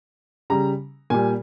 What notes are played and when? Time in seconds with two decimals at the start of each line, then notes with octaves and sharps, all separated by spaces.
0.50 C#3 G3 A#5
1.10 A#2 G3 G#5